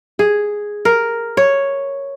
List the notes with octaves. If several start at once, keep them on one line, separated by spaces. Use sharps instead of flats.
G#4
A#4
C#5